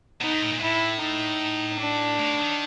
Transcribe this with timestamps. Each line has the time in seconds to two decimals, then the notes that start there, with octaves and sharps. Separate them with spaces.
0.21 B2 D#4
0.32 G#2
0.42 A2
0.52 A#2
0.57 G#2
0.61 A2 E4
1.01 D#4
1.80 D4
2.19 A2
2.39 D#3